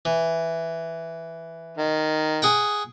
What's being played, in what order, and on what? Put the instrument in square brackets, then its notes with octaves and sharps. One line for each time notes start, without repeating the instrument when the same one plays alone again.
[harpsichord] E3
[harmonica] D#3
[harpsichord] G#4 F#5 G5